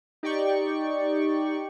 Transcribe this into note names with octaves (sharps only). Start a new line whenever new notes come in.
D#4 G4 D5 G5 C#6